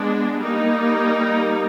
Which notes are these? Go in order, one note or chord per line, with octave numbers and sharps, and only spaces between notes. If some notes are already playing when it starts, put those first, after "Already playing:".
Already playing: G#3 B3 D4
G3 A#3 D#4